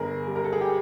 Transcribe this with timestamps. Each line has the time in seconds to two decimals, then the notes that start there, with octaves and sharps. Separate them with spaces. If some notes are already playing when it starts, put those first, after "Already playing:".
Already playing: G1 G#4 A#4
0.27 G3
0.36 A#4
0.44 A4
0.53 G#4
0.61 G4